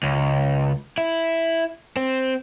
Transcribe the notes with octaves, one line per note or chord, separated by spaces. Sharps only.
C#2
E4
C4